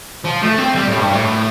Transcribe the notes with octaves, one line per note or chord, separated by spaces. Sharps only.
F3
A3
C4
G3
A2
G2
A2